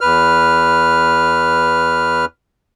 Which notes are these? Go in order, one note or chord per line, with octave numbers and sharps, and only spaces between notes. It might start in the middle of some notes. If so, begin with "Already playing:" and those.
E2 B4 F6